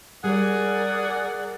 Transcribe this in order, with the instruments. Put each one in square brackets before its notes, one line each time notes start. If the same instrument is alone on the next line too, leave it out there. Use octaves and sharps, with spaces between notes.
[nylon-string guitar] G3 [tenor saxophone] G#4 [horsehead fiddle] A#4 D5 [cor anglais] F#5